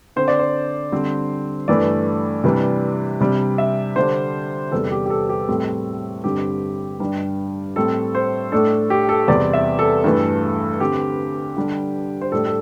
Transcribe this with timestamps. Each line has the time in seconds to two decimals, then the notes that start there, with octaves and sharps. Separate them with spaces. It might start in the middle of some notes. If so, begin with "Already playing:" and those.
0.16 D3 C4 C5
0.28 D5
0.39 C5
0.92 D3 G3 C4
1.68 G2 E3 A3 D5
2.44 C3 E3 G3 D4
3.20 C3 G3 D4
3.58 E5
3.96 D3 G3 D4 C5
4.72 E2 C3 G3 D4 A4
4.91 G4
5.06 G4
5.10 A4
5.29 G4
5.49 A2 G3 C4 A4
6.24 G2 D3 G3 C4 G4
7.00 G2 G3 D4
7.76 A2 G3 C4 A4
8.15 C5
8.52 A2 A3 D4 A4
8.90 G4
9.09 A4
9.28 E2 C3 G3 C4 D5
9.53 E5
9.79 A4
10.04 G2 E3 A3
10.80 D3 C4 G4
11.56 D3 G3 D4
12.21 C5
12.32 A2 G3 D4 A4
12.46 A4